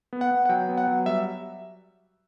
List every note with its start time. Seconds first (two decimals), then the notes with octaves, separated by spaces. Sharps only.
0.13 B3
0.21 F#5
0.31 B3
0.45 F#5
0.49 F#3 G5
0.69 B3
0.78 F#5
0.88 F#3
1.06 G3 E5